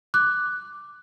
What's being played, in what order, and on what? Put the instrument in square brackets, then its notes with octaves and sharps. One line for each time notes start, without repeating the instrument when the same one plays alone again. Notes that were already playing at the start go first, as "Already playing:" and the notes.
[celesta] D6 F#6